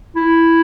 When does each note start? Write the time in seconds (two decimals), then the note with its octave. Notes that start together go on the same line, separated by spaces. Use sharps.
0.16 E4